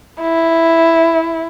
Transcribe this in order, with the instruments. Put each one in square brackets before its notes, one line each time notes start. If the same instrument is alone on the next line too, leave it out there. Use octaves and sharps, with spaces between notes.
[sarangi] E4